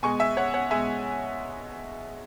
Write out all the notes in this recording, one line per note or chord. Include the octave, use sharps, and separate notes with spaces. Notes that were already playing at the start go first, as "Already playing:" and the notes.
B2 G#3 G#5 C#6
E5 G#5
C#5 F#5
C#5 F#5
B2 G#3 E5 G#5